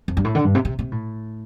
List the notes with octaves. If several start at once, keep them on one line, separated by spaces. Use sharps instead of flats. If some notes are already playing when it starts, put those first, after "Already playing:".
F2
G2
A2
D3
G2
C3
C3
C3
A2